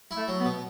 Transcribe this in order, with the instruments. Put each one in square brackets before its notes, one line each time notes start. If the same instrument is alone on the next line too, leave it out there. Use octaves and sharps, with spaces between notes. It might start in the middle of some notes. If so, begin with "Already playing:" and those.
[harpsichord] E4
[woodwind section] A3
[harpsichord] F#3
[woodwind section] B3
[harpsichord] B2